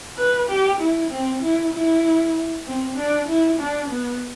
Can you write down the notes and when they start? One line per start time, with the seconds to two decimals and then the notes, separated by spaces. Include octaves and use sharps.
0.18 B4
0.50 G4
0.81 E4
1.11 C4
1.43 E4
1.74 E4
2.67 C4
2.98 D4
3.29 E4
3.60 D4
3.91 B3